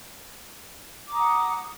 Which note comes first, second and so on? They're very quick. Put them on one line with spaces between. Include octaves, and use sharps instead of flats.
D6 A#5 D#6 F#5